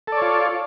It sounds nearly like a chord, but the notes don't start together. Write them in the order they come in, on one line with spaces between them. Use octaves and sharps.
A4 D5 C#5 F4